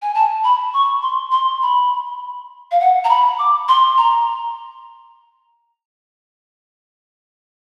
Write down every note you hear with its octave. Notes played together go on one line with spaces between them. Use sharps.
G#5
A5
B5
C#6
C6
C6
B5
F5
F#5
A#5
B5
D6
C6
A#5